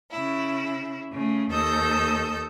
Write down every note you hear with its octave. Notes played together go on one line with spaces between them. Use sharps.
C#3 E4
C#3 A3
D#2 A4 D#5 E6 G6